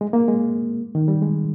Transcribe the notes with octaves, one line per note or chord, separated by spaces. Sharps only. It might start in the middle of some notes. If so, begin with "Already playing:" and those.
G#3
A#3
G#3
D#3
G3
G#3